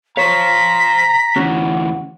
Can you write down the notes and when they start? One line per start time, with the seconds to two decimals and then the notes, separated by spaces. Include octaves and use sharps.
0.17 C5 C#5 F5 A#5 B6
1.36 D2 E3 C#4 F#4